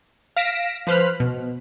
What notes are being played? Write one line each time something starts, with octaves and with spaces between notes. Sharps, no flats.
F5 A#6 B6 D7 E7
F3 B4 C5 F6 F#6 B6
B2